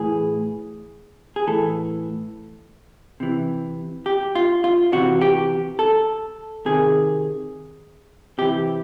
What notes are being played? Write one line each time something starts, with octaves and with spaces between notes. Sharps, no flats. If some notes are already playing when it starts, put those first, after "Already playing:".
Already playing: A2 E3 G#4
G#4
A2 E3 A4
C3 E3
G4
F4
F4
C3 E3 F#4
G4
A4
C3 D#3 G#4
C3 E3 G4